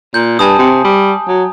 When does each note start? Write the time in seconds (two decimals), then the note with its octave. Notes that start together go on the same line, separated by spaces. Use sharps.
0.14 A#2 G6
0.39 G2 G#5 A5 D#6
0.58 C3
0.85 G3
1.28 F#3